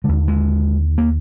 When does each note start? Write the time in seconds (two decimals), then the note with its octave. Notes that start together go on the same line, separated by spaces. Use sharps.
0.04 D#2 D3 G#3
0.28 G#3
0.98 A#3